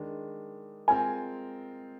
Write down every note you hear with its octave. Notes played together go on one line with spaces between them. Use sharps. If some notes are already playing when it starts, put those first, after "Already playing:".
Already playing: D#3 G#3 D4
G#3 C4 F4 A#4 G#5